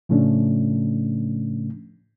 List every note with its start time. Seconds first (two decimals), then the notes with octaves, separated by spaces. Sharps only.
0.09 A2 C#3 F3 A3 C#4 D4